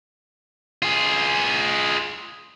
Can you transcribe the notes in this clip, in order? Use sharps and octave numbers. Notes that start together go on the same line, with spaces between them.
F4 G#4